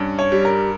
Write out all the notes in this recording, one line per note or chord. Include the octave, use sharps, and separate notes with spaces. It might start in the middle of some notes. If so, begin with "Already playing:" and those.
Already playing: G2 C#4
C#5
G3
A#4